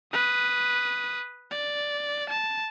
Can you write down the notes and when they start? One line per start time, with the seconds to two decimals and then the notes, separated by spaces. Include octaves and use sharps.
0.13 B4 D#6
1.51 D5
2.29 A5